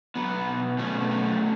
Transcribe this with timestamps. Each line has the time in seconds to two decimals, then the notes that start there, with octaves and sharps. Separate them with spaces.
0.15 F#3 B3
0.47 B2
0.78 B2 A3 C#4
1.10 F#3